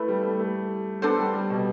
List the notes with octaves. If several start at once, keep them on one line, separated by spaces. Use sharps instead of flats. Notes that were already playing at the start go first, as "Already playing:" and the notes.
Already playing: A3 E4 B4
G3
A3
A3
B3 D4 A4 C5
G3
G3
B2